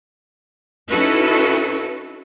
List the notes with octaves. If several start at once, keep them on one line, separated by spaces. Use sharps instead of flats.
C#4 D#4 E4 F#4 A4 B4